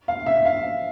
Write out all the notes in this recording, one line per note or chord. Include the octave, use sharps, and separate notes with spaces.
F5
E5
F5